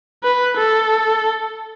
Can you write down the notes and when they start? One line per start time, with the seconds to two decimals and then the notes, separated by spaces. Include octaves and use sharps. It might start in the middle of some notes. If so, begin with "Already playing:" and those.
0.23 B4
0.57 A4